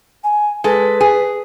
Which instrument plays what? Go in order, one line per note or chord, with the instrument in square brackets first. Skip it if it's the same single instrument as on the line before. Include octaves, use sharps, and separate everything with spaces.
[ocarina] G#5
[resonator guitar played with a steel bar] G#3 A4 [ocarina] B4
[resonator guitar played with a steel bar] G#4